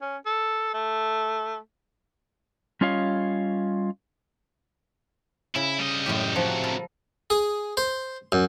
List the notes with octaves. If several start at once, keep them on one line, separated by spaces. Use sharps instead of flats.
C#4
A4
A3
G3 C#4 F4 C#5 D#5 F5
C#3 E4
G3 D#5
F#2 A2 G4
C3 F3 F#3
A4 A#4 B5
G#4
C5
F#2